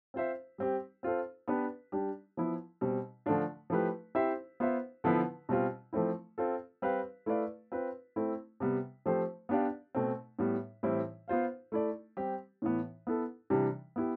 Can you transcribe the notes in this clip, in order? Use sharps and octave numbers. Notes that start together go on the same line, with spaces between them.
C4 F4 C5 E5
G3 C4 G4
C4 F4 A4 C5
B3 D4 G4 B4
G3 D4 G4
F3 B3 E4
B2 G3 C4
D3 F3 A3 D4 F4
F3 A3 E4 G4 B4
C4 E4 G4 C5 E5
B3 F4 C5 E5
D3 F3 B3 E4 B4
B2 G3 C4 F4
F3 A3 C4 E4
C4 F4 A4
G3 C4 G4 B4 F5
A3 E4 B4 D5 F5
C4 F4 B4
A3 C4 E4
C3 G3 B3
F3 A3 C4 G4 C5
B3 D4 G4 D5 F5
B2 A3 C4
A2 G3 B3
A2 E3 G3 C4 E4
B3 F4 C5 F5
A3 E4 A4 D5
G3 C4 G4
A2 E3 B3
B3 E4 A4
C3 E3 G3 D4
B3 E4 G4